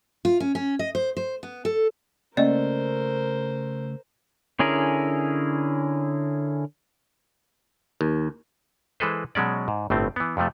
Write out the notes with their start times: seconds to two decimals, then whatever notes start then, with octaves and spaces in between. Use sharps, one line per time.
0.25 F4
0.40 C#4
0.55 C#4
0.79 D#5
0.95 C5
1.17 C5
1.43 B3
1.65 A4
2.37 C#3 A3 A#3 C#4 A#4 C5 D5 D#5
4.59 D3 C#4 E4 G#4 A#4
8.01 D#2
9.00 E3 G#3 A4 B4 C5
9.35 B2 F#3 G#3 C#4 D5
9.68 G#2
9.90 G1 A2 A3 C4
10.16 E3 B3
10.37 F2 C3 F3 A3